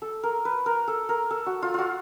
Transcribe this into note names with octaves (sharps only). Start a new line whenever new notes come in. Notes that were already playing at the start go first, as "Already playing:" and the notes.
A4
A#4
B4
A#4
A4
A#4
A4
F#4
F4
F4 F#4